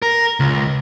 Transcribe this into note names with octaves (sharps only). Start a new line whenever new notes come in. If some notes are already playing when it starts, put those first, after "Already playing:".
A#4
C#2